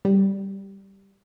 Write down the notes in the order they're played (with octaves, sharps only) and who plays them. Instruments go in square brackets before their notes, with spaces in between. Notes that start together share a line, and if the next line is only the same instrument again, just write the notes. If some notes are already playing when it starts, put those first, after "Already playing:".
[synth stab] G3